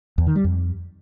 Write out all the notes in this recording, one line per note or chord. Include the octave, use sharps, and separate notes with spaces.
E2
D#3
G3
F2